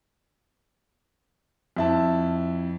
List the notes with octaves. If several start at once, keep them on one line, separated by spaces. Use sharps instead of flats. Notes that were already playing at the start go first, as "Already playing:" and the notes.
F2 E4 A5